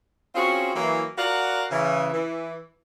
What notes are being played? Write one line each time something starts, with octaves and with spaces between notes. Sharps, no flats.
C4 C#4 F4 F#4 G#4 C5
E3 F#3 A#3
F#4 A#4 D5 F5 F#5
C#3 E3
E3